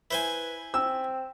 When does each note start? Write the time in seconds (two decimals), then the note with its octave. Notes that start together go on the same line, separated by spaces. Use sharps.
0.11 E4 B4 C5 G#5
0.74 C4 E6